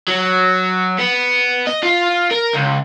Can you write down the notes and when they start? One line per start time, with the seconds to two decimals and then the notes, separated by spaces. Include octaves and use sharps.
0.08 F#3
0.98 B3
1.67 D#5
1.83 F4
2.31 A#4
2.53 C#2